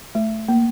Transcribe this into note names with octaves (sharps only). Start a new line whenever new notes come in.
A3
A#3